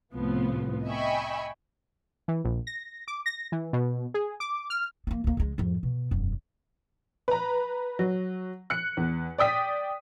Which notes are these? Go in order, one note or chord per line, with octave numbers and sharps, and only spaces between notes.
C2 A2 F3 B3
D#5 E5 G5 G#5 B5 C#6
E3
A#1
A#6
D6
A#6
E3
B2
G#4
D6
F6
A#3 B3
D2 A#3
C#2 G#3
F2 G#2
B2
E1 F#2
B4 A#5
F#3
F#6 C#7
E2
D5 G5 D#6 B6